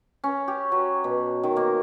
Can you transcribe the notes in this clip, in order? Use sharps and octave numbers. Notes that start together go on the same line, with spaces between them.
C#4
G4
F#3
B2
D#3
A#3